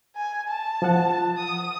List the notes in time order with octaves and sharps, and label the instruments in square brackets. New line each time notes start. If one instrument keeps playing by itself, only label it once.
[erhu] G#5
A5
[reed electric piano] F3 F#5
[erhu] D#6